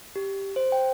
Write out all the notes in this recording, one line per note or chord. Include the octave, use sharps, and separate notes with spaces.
G4
C5
G5